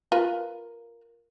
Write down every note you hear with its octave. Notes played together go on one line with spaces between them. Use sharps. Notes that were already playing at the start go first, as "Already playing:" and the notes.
F4 A#4 B4